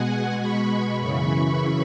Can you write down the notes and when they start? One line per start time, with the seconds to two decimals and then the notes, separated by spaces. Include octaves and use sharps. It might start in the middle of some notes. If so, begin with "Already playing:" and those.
Already playing: B2 G#3 F#5 G#5
0.40 B5 C#6
1.00 F#2 C#3 E3 B5 C#6